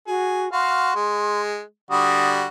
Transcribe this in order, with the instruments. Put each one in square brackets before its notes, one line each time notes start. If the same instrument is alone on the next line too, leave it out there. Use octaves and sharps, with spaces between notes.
[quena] F#4 [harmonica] G#4
[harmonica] F#4 F5 [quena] C6
[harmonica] G#3
[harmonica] D3 G3 F#4 [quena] D#6